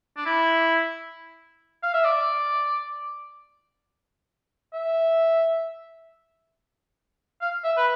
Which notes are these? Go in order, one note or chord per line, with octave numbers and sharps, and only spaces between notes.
D4
E4
F5
E5
D5
E5
F5
E5
B4